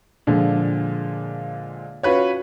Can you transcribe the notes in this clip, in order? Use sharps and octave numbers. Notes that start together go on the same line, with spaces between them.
A#2 D3 F3 G#3
C#4 F4 F#4 B4 C#5